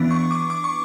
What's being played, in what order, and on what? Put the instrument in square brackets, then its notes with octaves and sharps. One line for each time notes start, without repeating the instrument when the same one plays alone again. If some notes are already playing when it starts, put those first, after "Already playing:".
Already playing: [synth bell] E3 B3 D4
C#6
D6
D6
C#6